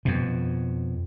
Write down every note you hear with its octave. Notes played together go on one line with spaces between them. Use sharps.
F2 B2